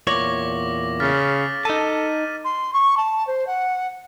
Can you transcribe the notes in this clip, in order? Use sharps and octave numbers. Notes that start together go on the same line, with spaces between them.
E2 A#2 C#5 D6 A#6 F#7
C#3 F6 A6 B6
D#4 A4 A5 D#7
C6
C#6
A5
C5
F#5